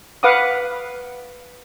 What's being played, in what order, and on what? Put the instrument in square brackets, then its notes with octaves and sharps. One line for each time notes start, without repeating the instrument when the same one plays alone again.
[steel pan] B4 F5 F#5 D6 D#6